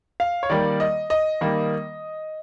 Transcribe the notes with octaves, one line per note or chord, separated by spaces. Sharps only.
F5
C#5
D#3 G3 A#3 D5
D#5
D#5
D#3 G3 A#3